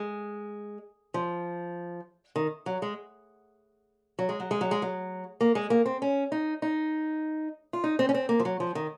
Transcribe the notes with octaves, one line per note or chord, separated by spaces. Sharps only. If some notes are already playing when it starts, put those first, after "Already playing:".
Already playing: G#3
F3
D#3
F#3
G#3
F#3
G#3
F#3
G#3
F#3
G#3
F#3
A#3
G#3
A#3
C4
C#4
D#4
D#4
F4
D#4
C4
C#4
C4
A#3
F3
F#3
F3
D#3